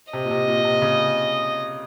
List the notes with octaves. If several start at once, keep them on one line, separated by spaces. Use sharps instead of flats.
C3 D#5
A#2
C3
A#2
C3
C#3